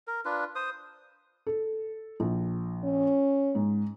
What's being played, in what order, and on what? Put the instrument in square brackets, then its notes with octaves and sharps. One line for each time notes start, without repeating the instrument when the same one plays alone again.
[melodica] A#4
D4 F4 B4
C5 D#6
[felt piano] A4
A#1
[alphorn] C#4
[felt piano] G#2